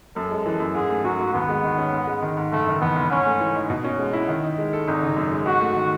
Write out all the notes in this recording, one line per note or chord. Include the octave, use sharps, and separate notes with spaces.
F#2 A4
G#3
E3
F#2
G#2 G#4
A3
F#3 F#4
G#2
D#2 B3
G#3
D#3
C#4
G#2
G#3
D#3
G#2
F#1 A3
D#3
E2 B3
F#1
G#2 C#4
A3
E3
D#4
B2
C#4
G#3
E4
D#3
D#4
G#3
A4
G#1 D#4
C#3
F#2
G#3
G#2 F#4
A3
D#3